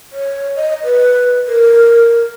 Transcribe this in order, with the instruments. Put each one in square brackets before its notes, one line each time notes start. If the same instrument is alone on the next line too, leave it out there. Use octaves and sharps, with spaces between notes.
[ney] C#5
D#5
B4
A#4